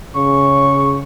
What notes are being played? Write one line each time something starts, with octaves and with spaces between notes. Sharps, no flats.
C#3 C#6